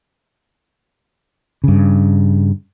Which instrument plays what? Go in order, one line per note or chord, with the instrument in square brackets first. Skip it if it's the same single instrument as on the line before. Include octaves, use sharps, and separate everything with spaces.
[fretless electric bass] G2 C#3